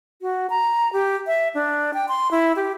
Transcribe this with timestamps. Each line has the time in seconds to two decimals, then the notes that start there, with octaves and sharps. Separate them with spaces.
0.22 F#4
0.50 A#5
0.93 G4
1.27 E5
1.54 D4
1.94 G5
2.08 C6
2.31 E4
2.56 G4